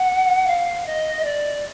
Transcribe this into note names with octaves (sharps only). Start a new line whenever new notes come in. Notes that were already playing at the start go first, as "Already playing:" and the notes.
Already playing: F#5
F5
D#5
D5